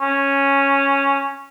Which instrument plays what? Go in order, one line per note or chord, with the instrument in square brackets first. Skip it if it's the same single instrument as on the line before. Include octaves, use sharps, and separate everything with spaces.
[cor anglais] C#4